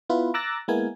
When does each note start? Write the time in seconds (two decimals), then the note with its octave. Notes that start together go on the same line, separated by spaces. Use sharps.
0.09 B3 E4 F4 B4
0.34 A#5 D6 E6 F#6 A6 A#6
0.68 G#3 A#3 B3 E4 A#4 G#5